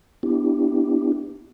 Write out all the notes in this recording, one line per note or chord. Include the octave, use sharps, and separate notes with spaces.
B3 D4 E4 G4